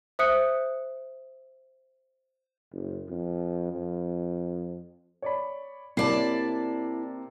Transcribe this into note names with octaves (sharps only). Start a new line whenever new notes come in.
C5 E5 D#6 F#6 C#7
F#1
F2
F2
C#5 D5 B5
C3 A#3 E4 D5 A5 C7